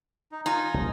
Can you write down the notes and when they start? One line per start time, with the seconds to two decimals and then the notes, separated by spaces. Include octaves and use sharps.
0.32 D#4
0.46 D#4 F4 G#5
0.74 C2 A#2 F3